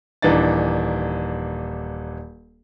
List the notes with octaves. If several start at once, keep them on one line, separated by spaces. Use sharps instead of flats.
D#1 E3 D4 D#4 A6